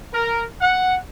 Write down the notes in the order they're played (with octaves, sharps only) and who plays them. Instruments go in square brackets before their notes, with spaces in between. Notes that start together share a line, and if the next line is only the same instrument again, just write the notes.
[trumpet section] A#4
F#5